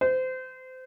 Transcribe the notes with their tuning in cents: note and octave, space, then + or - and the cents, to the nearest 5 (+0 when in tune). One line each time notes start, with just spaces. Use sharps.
C5 -25